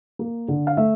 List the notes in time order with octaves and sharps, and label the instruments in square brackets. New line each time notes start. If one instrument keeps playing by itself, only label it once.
[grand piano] A#3
D3
F5
A3 E5